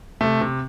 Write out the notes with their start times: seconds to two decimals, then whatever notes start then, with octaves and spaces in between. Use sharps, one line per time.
0.21 C3 A3
0.41 C3